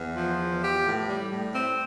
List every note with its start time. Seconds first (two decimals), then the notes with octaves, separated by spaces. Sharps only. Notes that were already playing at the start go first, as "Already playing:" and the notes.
Already playing: E2
0.15 F3
0.38 E2
0.62 G4
0.84 A2
1.07 G3
1.30 A2
1.53 C4